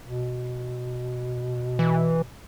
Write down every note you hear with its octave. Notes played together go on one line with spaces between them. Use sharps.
B2
E3